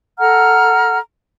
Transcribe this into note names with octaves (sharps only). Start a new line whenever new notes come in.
A4 F#5 A#5 F6